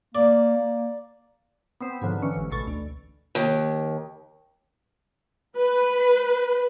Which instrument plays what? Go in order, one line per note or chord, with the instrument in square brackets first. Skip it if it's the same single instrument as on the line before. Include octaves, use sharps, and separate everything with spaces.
[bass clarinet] A#3 [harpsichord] D5
[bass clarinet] A#3
[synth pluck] B3 C4 C5
G#2 B2 D3 F3 F#3
D3 E3 C#4
G1 C#2
A1 B2 A4 C#6 A6
D2
[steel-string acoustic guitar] D#2
[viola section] B4